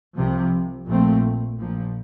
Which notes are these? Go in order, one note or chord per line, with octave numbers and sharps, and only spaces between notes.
C2 C3 F3
A#1 A#2 F3 A3 C4
A#1 A#2 F3